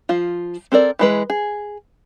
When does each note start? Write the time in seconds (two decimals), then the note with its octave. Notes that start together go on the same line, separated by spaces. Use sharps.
0.09 F3 F4
0.72 C4 A4 A#4 D5
0.99 E3 G#3 B4
1.30 G#4